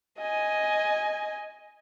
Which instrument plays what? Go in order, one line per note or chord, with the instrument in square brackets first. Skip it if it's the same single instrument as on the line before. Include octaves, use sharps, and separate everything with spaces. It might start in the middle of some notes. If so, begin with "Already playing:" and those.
[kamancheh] D#5 G#5